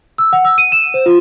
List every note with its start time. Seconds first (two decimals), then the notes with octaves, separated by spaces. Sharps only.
0.18 E6
0.33 F#5
0.45 E6
0.58 D#7
0.72 E7
0.94 C5
1.06 F4